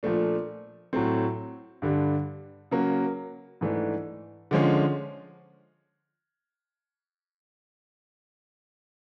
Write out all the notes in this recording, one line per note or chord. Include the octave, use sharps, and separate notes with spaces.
A#2 F3 A3 D4
A2 F#3 A3 C4
G2 D3 G3
C#3 F#3 A#3
G#2 E3 A3 D4
D3 F3 G#3 C#4